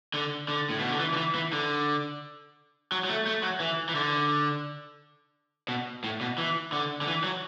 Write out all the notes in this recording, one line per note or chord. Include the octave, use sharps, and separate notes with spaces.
D3
D3
A2
B2
D3
E3
D3
E3
E3
D3
F#3
F#3
A3
A3
F#3
E3
E3
D3
B2
A2
B2
E3
D3
D3
E3
F#3